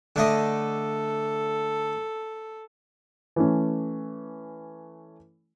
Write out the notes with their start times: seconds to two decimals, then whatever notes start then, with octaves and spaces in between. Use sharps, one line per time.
0.16 D3 A3 A4 D#5
3.36 E3 A3 C#4